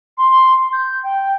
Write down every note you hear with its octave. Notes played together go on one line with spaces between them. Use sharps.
C6
G6
G5